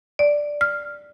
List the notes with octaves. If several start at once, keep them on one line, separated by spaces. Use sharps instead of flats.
D5
F6